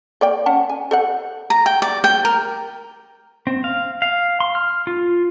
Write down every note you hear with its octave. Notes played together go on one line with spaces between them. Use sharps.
A#3 D5 G5
C#4 F#5 A5
G#5
A4 C5 F#5
A#5
G5
D5
G5
A#4
C4
F5
F5
C6
F6
F4